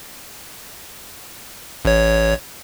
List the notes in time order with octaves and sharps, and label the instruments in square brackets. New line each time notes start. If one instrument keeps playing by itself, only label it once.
[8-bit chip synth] A1 C#5